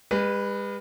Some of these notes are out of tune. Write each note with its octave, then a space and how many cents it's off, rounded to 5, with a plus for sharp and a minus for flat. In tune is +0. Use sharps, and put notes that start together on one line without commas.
G#3 -45 B4 +0